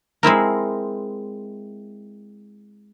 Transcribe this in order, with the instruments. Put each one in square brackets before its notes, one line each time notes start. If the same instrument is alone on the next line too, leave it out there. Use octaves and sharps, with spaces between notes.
[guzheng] G#3 C4 E4 A#4